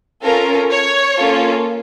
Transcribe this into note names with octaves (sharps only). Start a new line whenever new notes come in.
C#4 F4 A4 A#4
C#5
A#3 C#4 F4 A4